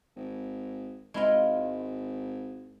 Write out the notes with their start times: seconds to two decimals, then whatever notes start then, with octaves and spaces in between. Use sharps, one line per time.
0.16 G#1
1.14 G#1 G#3 E4 F4